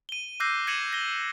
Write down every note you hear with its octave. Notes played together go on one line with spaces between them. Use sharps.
D#7 G7
D6 E6 F#6 G6 A#6 C7
G#6 A#6 C#7 D#7 E7 F#7
A#6 G7